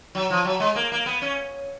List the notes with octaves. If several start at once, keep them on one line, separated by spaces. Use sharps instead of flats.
F#3
F3
F#3
G#3
A#3
A#3
B3
C#4